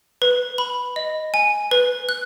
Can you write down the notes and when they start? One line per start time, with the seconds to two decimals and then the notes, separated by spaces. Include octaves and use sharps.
0.22 B4
0.58 B5
0.96 D#5
1.34 G#5
1.71 B4
2.09 F#6